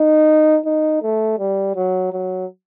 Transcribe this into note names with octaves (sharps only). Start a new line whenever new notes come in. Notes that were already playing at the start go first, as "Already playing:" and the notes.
Already playing: D#4
D#4
A3
G3
F#3
F#3